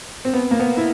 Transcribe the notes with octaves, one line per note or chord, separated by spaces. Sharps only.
C4
B3
A#3
B3
E4